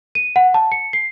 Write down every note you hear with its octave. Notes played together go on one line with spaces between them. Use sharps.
D#7
F#5
A5
C#7
C7